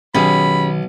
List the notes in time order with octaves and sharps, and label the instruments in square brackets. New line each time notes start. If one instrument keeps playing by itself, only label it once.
[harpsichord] B1 [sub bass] D#3 [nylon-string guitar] C#4 G4 G#4 [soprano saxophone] B5